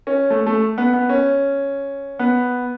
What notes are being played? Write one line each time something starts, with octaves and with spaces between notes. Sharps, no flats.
C#4
A3
A3
B3
B3
C#4
B3